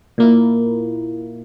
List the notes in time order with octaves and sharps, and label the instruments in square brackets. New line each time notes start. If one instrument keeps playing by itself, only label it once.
[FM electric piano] A#2 A#3 E4